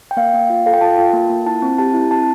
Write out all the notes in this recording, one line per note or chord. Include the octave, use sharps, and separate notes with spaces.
G5
A#3 F5
A#3
F4
A4 F5
G5
F4 A5
F4
A#3
A#3
E4 A5
C4
G4 A5
E4
C4 A5